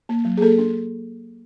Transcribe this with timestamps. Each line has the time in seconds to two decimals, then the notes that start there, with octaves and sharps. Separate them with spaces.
0.09 A#3
0.25 F#3
0.37 G#4
0.41 A#3 A4
0.58 D4